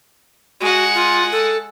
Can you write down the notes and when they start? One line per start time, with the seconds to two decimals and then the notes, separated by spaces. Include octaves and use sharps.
0.61 G#3 F#4 F#5
0.94 F4
1.32 A4